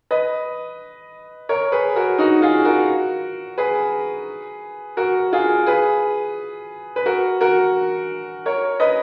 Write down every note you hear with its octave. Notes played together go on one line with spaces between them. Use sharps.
B4 D#5
A#4 C#5
G#4 B4
F#4 A#4
D#4 F#4
F4 G#4
F#4 A#4
G#4 B4
F#4 A#4
F4 G#4
G#4 B4
B4
F#4 A#4
F#4 A#4
A#4 C#5
B4 D#5